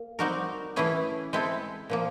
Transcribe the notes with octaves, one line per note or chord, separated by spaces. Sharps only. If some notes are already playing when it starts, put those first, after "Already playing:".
Already playing: A#3
G3 C4 D#4 F#4 A#4
E3 A3 C#4 E4 G#4
G#3 C4 E4 A4
A#2 F3 A#3